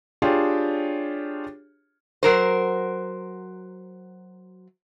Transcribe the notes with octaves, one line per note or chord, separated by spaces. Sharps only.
D4 F4 G4 G#4 C#5
F#3 A#4 C5